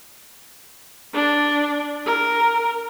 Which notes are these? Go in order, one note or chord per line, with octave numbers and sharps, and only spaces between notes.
D4
A#4